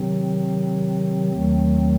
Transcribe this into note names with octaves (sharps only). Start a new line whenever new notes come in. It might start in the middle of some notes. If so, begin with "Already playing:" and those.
Already playing: C3 D#3 F#3 C4
D#2 D#3 F#3 A3 C4